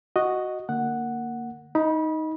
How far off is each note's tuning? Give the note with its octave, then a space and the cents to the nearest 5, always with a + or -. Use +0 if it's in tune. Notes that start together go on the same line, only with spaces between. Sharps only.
F#4 +0 D#5 -5
D3 +20 A#3 -10 F#5 +0
D#4 +10 B5 -30